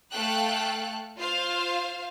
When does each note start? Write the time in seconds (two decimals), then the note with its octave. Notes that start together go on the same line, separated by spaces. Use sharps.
0.11 A3 A4 F5 G5 F#6
1.18 F4 C5 F5